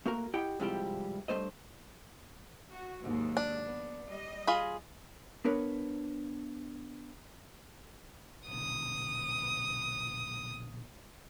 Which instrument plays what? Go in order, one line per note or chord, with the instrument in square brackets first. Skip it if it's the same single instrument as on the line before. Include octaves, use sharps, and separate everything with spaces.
[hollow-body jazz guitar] A3 A#3 F#4 A#4
E4 G4 D#5 F#5 G5
G#2 C3 F3 G3 E4 G4
G2 F#3 A3 C5 D#5
[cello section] F#4
D#2 G#2 F#3
[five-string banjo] D4
[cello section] B3
G3 D#5
[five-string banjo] F4 G#4 B5
[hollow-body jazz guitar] B3 D4 A#4 B4 C#5
[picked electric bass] A#1 B2 D3 [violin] D#6